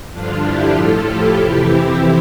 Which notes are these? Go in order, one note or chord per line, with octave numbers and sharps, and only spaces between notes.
G2 D3 F3 D4 F4
E4 G4
A2 F3 F4 A4
E4 G4
F2 C3 E3
C4 E4